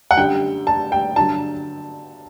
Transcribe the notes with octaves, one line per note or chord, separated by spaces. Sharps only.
F#5
F#2 D3 G3 G5
A5
G5
G2 D3 F#3 A5